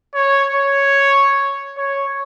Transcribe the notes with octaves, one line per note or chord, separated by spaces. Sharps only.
C#5
C#5
C#5